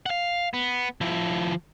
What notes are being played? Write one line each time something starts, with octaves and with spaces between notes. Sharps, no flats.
F5 F#5
B3
F3 E4